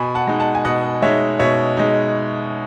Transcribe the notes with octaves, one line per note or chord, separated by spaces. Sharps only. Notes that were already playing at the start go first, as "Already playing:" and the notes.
Already playing: B2 G#5 B5
F#5 A5
G#3 D#4
F#5 A5
G#5
B2 D#5 F#5
G#3 D#4 C#5 E5
B2 C#5 E5
G#3 D#4